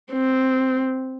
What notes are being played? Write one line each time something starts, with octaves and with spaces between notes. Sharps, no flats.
C4